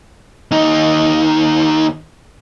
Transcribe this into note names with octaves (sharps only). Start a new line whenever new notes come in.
D#2 D#4